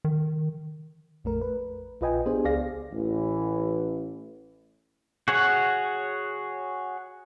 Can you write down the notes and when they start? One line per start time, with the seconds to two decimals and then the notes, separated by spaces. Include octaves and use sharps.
0.05 D#3
1.24 A#1 F2 A3 A#4
1.41 B4
2.01 A#1 F4 B4 D#5 G5 G#5
2.26 B3 D4 G4 G#4 C5
2.45 C#2 G#4 D5 F5 A#6
2.91 A1 E3
5.28 F#4 G#4 C#5 F#5